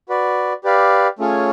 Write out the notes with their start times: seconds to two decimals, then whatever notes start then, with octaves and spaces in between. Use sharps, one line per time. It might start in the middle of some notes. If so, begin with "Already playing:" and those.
0.09 F#4 B4 D5
0.64 G4 B4 D5 F5
1.19 A3 C#4 F4 G#4 C#5